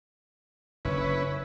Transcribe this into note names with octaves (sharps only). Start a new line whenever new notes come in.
F#1 D3 C#4 E4 B4